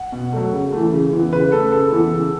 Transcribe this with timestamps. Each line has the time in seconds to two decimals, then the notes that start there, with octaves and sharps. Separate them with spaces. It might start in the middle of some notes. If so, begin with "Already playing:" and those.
Already playing: F#5
0.12 B2
0.33 F#3 A3
0.52 C#3
0.72 E3 A3
0.92 C#3
1.13 E3 B3
1.32 C#3 B4
1.52 A3 A4
1.72 C#3 A4
1.92 E3 B3
2.12 C#3